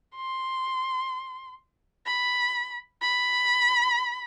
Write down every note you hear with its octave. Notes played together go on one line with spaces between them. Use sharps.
C6
B5
B5